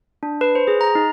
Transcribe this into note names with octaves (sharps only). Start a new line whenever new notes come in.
D4
B4
C5
G#4
A#5
D#4